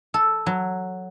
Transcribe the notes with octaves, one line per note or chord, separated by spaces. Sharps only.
A4
F#3